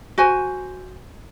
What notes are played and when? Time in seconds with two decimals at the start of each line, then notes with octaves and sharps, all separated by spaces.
0.18 F#4 C5 G#5